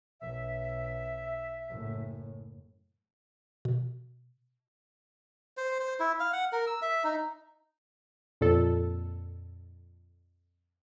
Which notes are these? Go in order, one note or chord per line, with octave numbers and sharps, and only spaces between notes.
B1 E5
F#1 A2
B2
C5
C5
E4
F5
F#5
A#4
E6
E5
D#4
F2 A#2 A4